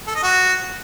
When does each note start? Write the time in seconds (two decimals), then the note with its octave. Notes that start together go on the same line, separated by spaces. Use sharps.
0.07 A4
0.15 D#5
0.23 F#4